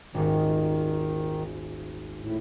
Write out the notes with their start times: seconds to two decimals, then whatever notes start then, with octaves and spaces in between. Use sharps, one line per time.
0.14 D#1 G#1 D#3
2.21 A2